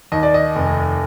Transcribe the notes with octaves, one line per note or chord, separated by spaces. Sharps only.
D#2 D#5
D5
D#5
F1